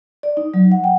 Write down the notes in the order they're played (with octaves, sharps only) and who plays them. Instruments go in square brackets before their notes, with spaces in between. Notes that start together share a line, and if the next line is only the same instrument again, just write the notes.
[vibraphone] D5
D#4
F#3
F#5
G5